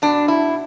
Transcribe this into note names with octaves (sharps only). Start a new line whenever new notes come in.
B2 D4
E4